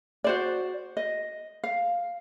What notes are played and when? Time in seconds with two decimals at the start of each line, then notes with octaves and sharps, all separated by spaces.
0.24 F#4 C5 D5
0.97 D#5
1.64 F5